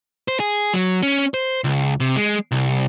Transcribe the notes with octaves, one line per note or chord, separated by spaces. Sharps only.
C5
G#4
F#3
C#4
C5
C#2
C3
G#3
C2